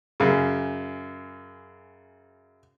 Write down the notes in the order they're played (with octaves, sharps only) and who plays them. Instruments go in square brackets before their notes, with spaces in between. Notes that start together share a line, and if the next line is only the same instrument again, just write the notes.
[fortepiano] F#2 C#3